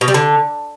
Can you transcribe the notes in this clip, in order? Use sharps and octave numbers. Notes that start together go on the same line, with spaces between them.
B2
G3
D3